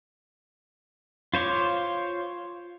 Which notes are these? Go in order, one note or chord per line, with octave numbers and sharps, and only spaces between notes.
F4 C5 C#5 F5 D6